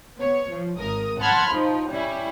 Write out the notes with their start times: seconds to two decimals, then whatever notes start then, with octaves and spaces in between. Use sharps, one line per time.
0.18 B3 C#5
0.48 F3
0.79 G#1 A#4 D#6
1.20 F#5 A5 B5 C6 F6 G#6
1.51 F3 D#4
1.90 G3 C#4 E4